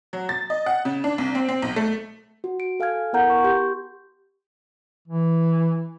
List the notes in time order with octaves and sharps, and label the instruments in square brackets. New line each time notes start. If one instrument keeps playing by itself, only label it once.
[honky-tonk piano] F#3
A6
D#5
F#5
C#3
D4
C2
C4
C4
B1
A3
[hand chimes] F#4
D7
A4 F5 G#5 F6 G#6
B3 E4 A#4 F#5 A#5 G6
C#6
G4 C6 G6
[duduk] E3